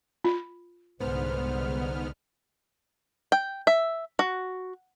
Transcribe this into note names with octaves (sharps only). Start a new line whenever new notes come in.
F4
C2 G#2 D3 B3 C5 F6
G5
E5
F#4